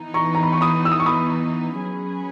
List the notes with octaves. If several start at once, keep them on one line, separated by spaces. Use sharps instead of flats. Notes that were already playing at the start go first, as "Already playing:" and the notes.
Already playing: E3 B3 D#4
A#5 C#6
A#5
B5
C#6
B5 D#6
E6
D#6
C#6
B5 D#6
F#3 C#4 G#4 B4